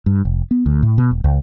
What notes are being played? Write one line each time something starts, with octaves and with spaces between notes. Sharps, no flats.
G2
F1
B3
D2
A2
B2
E1
C#2